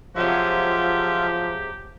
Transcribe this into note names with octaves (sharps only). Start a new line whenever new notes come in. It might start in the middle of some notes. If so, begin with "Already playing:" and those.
C3 F3 F#3 G#3 F4 G4 E5